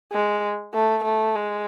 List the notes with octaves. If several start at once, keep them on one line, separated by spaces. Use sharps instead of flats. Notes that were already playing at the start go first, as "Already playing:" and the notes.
G#3
A3
A3
G#3